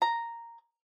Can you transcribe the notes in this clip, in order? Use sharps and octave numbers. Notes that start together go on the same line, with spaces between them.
A#5